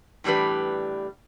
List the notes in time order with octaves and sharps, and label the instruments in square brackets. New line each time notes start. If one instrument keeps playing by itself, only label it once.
[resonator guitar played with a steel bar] A2 E3 G3 D4 B4